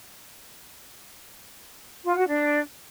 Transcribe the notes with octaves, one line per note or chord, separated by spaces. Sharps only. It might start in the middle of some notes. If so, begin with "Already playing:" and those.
F4
F#4
D4